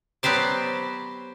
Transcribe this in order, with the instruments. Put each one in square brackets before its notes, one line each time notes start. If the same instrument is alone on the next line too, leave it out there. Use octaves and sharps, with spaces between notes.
[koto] F#3 B3 G4 C5 D5